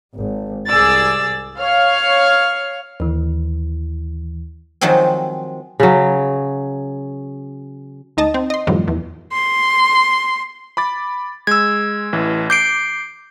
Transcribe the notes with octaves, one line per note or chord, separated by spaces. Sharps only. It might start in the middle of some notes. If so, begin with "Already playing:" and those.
G#1
C2 G#4 D5 E6 A6
C#5 F5 F6
D#2 E3
D#3 F3 F#3 G#3 C4
C#3 F#3
D2 D#4 D#5 A5
C4
D#5 C6
F#2 A2 C3 D#3 F3 G3
E2
C6
B5 D6 A6
G#3 E6 G#6
A1 E3
D6 G6 C7 D7